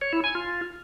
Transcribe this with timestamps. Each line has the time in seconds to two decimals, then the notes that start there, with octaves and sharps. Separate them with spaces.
0.01 C#5
0.13 E4
0.24 G#5
0.35 F4